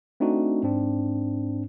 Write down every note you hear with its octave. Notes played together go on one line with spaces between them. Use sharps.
A3 C4 D4 D#4 F#4
G#2 C4 D4